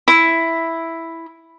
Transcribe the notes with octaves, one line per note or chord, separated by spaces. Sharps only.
E4